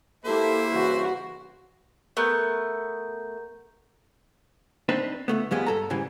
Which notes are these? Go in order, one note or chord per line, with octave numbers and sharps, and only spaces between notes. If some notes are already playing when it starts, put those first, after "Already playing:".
A#3 E4 G4 A4 C5 E5
G2 C#3 E3 F#4 B4
A3 B3 A#4 A#5 G6
C4 D4 D#4 B4
C#2 A3 B3
F2 G3 G#3 B3
G2 A4 A#5
G#2 C#3 E3 G3